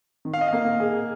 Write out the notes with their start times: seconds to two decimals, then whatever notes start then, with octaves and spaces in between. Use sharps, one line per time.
0.25 D#3
0.33 F5
0.41 D#5
0.48 A#3 F5
0.80 G#4